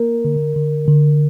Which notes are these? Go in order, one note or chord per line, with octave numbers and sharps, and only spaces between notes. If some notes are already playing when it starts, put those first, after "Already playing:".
Already playing: A#3 A#4
D3
D3
D3